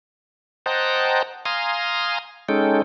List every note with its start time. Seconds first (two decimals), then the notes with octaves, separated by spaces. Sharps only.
0.66 C5 D#5 F#5 G5 A5 A#5
1.45 F5 G#5 A#5 C6 D#6
2.49 G#3 C#4 D#4 A4 G5